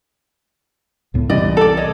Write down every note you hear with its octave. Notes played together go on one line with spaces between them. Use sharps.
C#2 A2 B3
C2 E3 D5 D#5
A4 D5
C#5 D#5